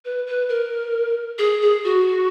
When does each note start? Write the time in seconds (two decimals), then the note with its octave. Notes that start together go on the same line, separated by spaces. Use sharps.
0.05 B4
0.27 B4
0.49 A#4
1.38 G#4
1.62 G#4
1.84 F#4